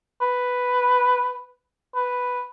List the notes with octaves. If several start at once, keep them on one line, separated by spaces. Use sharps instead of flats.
B4
B4